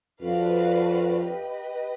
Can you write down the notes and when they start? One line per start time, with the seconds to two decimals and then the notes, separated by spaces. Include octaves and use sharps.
0.22 F2 D4 F#4 B4 D5 F5
1.21 G4 B4 D#5